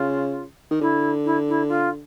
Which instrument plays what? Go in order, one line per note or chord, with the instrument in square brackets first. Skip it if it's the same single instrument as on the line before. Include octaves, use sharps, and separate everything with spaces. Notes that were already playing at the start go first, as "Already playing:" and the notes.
Already playing: [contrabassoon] C#3 [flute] F4
[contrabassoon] D#3
[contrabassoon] D3 [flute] E4
[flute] E4
E4
F4